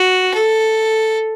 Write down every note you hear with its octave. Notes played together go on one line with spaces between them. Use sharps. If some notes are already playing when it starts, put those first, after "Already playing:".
Already playing: F#4
A4